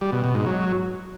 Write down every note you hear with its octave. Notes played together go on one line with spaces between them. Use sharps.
G3
B2
B2
G#2
F#3